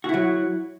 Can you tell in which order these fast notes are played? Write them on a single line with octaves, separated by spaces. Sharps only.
F#4 E4 F#3